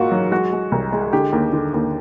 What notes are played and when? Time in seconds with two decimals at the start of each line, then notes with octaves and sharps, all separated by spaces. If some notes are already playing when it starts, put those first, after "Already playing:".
Already playing: G#2 A#3 F4 F#4 A#4
0.11 F#3
0.31 G#3 F#4
0.52 G#3
0.72 C2
0.92 G#3
1.13 D3 G4
1.33 D#2
1.53 D3
1.74 D#2